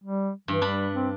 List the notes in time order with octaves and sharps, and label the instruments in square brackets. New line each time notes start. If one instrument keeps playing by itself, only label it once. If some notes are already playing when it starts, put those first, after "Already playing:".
[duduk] G3
[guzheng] G2 [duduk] E3
[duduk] G3 [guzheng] D4 B5
[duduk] C4